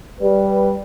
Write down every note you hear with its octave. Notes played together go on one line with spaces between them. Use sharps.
G3 B4